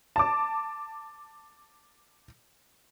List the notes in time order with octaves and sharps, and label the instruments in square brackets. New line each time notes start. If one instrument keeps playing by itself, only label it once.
[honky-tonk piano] A5 D6